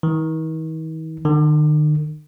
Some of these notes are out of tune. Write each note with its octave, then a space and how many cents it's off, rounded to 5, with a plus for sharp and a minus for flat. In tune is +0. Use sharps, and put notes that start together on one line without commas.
D#3 +45
D#3 -45